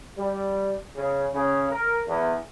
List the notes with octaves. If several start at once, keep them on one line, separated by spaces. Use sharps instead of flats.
G3
C#3
C#3
A#4
E2